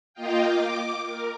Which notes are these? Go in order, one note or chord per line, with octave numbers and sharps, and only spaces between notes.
A#3 F4 D#5 F5 G5
D6
A#4